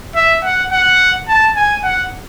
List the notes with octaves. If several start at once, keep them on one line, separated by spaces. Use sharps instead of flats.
E5
F#5
F#5
A5
G#5
F#5